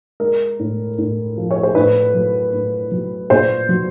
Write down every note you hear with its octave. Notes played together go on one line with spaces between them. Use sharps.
G#3 A#4
A2
A2
F3
C#5
C5
A2 B4
F#3
A2
F#3
A#2 C5
F#3